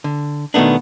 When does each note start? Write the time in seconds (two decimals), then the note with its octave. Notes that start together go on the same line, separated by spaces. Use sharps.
0.04 D3
0.54 B2 D#3 F#3 A3 B3 D4